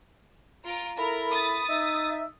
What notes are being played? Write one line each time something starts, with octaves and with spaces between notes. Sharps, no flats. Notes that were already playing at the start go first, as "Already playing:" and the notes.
F4 A#5 D7
E4 A4 A#4 B5
D#6 A6
D#4 E5